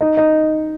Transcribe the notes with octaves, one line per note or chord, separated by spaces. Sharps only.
D#4
D#4